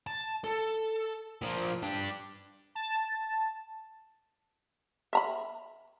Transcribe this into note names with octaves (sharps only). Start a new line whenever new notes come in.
A5
A4
A#2 F3
D4 G4
A5
E5 A#5 B5